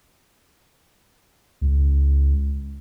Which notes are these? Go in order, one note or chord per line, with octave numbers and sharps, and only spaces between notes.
C#2